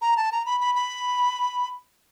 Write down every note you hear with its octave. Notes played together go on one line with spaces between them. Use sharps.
A#5
A5
A#5
B5
B5
B5